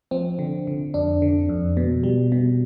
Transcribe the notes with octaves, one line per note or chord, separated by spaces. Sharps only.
F3 C4
D3
D3
F2 D4
D3
F2
B2
G3
B2